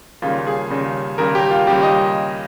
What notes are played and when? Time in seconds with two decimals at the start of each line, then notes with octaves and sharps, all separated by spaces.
0.22 D#2 C#3 G3 F4
0.47 G#4
0.70 D#2 C#3 G3
1.18 D#2 C#3 G3 A#4
1.35 G4
1.51 F4
1.67 D#2 C#3 G3 G4
1.83 D#5